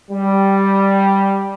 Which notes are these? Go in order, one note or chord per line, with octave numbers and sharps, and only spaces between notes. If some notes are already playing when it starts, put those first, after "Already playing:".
G3